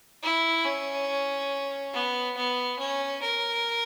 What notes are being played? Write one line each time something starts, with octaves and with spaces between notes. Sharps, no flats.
E4
C#4
B3
B3
C#4
A#4